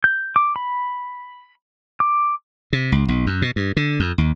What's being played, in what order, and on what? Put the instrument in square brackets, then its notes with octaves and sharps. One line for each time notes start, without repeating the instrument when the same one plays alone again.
[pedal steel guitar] G6
D6
B5
D6
[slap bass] C3
C#2
B1
F#2
B2
G2
D3
F2
D#2